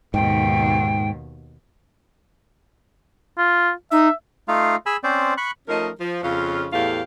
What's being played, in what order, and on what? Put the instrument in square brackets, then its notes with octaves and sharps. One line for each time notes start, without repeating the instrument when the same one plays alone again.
[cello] D#2 B2 [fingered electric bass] G#2 [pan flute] G5
[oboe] F4
[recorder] D#4 [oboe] E5
[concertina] A3 D#4 F4 F5
G#4 G#5 B5 E6
C4 C#4 C5 D5
B5 C#6 F#6
[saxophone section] F3 A3 C#4 D#4 A#4 D#5
F3
F2 C#3 C#4 F4
E2 A2 A3 G4 F5